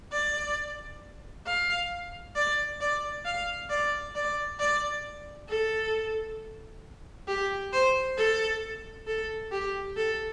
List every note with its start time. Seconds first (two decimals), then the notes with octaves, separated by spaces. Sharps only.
0.12 D5
1.46 F5
2.36 D5
2.81 D5
3.25 F5
3.70 D5
4.15 D5
4.60 D5
5.49 A4
7.28 G4
7.73 C5
8.18 A4
9.07 A4
9.52 G4
9.96 A4